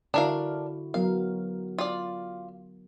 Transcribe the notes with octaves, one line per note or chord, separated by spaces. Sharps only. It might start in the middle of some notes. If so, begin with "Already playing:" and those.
D3 D4 E4 F#4 A#4 F5
F#3 B3 A#4 F5
F4 D5